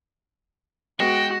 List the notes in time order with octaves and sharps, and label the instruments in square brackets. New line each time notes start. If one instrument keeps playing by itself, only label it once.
[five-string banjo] G#3 B3 [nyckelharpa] F#4 [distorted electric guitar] G5 [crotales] A#6 C#7 E7